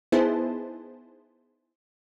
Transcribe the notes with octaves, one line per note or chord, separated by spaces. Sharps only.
B3 D#4 E4 G#4 C5 A5